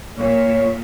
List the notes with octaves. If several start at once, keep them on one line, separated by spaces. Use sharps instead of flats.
A#2 C#5